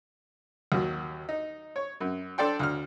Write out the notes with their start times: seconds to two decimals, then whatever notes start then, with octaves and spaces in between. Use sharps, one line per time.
0.72 D#2 F#3
1.29 D#4
1.76 C#5
2.01 F#2
2.38 D4 A4 D5 G5 C6
2.60 D2 F6